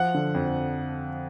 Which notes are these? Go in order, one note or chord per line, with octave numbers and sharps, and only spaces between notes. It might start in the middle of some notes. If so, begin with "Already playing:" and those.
Already playing: F3 F#5
D3
F2